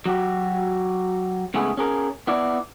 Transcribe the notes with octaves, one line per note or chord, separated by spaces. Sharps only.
F#3 F#4 G4
C#3 G#3 A3 B3 E4 G#4
C#4 G#4 A#4
B3 E4 D5